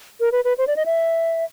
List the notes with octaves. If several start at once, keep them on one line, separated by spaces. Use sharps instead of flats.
A#4
B4
B4
C5
D5
D#5
E5